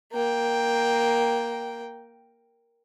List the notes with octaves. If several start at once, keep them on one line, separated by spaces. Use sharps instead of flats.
A#3 G5